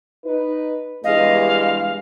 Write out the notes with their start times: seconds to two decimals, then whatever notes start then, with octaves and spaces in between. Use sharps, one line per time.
0.25 D#4 B4
1.04 E2 G2 G#3 D#5 F5